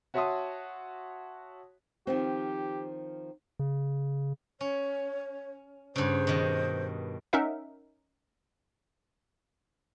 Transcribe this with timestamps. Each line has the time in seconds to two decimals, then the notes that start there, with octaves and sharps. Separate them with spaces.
0.14 F#4 C#5 E5 A5 C6 D#6
2.07 D#3 F3 C4 G4
3.59 C#3
4.61 C#4 C#5
5.96 G2 C#3 C5
6.27 B2 D#3
7.33 C#4 D#4 A#4 E5 F#5